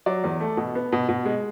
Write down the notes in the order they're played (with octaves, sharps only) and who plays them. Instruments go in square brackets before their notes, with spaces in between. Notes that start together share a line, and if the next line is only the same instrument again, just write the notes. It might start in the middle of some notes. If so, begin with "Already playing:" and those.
[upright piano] F#3 D5
E2
A3
B2
B3
B2
B2
G#3